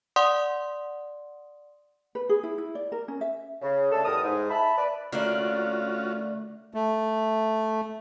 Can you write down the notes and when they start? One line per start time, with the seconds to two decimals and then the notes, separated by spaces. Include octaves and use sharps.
0.16 D5 F#5 C6 D#6
2.15 B4
2.29 G#4
2.43 E4
2.58 E4
2.75 D5
2.92 A#4
3.08 C#4
3.21 E5
3.62 C#3
3.92 C#3 G#3 A3 D4 A4
4.05 E2 A2 G3 A#4 D#6
4.23 G#2
4.50 E5 A5 B5
4.77 B4 D5
5.12 D3 A3 A#3 C#4 F4 F#4 D5
6.74 A3